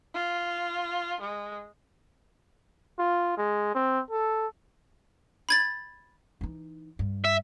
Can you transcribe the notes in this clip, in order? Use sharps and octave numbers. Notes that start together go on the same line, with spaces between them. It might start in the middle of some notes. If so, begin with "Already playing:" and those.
F4
G#3
F4
G#3
C4
A4
B5 G#6 A6
E3 D#4
G2
E5